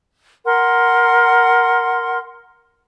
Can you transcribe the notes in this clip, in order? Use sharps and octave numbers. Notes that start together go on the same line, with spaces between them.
A#4 F#5 C6